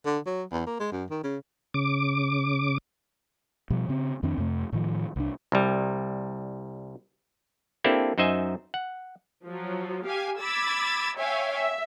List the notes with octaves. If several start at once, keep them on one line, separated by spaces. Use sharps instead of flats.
D3
F#3
E2
A#3
G#3
F#2
D#3
C#3
C#3 D6
B2 F3 G3
C#3 C4
F2 D#3 C4 D4
F2 C3 A3
A2 D#3 F3
C2 D4
C2 G3
A#3 C4 D4 E4 G4 A4
F#2 D#4 C5 D#5 E5 G#5
F#5
F3 F#3
G4 F5 G#5
B5 D6 E6 G#6 A6
C#5 E5 F5 G5 G#5
E5